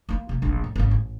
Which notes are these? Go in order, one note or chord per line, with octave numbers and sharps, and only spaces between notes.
A#3 F4
C3 A#3
F1 A#1
A2
G#1 C#3
A1